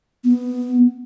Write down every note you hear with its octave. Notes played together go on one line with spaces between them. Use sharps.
B3